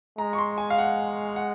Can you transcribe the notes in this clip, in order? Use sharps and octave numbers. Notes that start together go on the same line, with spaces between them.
G#3 A#5
C#6
C6
G#5
F5
F#5
F#5